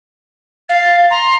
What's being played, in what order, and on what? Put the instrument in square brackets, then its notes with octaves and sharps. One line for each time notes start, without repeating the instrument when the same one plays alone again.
[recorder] F5 [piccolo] A6
[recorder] A#5 [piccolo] C6